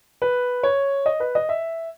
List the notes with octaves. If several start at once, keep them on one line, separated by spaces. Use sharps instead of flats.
B4
C#5
D#5
B4
D#5
E5